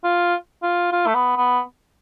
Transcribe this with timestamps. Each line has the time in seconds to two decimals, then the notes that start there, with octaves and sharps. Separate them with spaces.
0.04 F4
0.63 F4
0.92 F4
1.07 A3
1.15 B3
1.37 B3